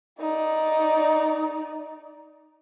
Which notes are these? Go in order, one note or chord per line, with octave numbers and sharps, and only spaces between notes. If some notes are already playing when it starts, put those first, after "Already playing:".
D#4 D5